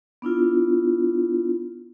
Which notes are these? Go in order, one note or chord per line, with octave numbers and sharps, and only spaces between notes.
B3 D4 E4 F4